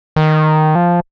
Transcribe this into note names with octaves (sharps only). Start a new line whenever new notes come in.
D#3
F3